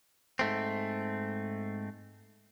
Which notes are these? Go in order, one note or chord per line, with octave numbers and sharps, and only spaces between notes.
G#2 A3 C4